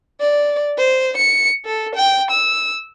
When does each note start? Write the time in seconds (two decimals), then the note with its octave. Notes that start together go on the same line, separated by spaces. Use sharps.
0.20 D5
0.78 C5
1.17 C#7
1.65 A4
1.95 G5
2.30 E6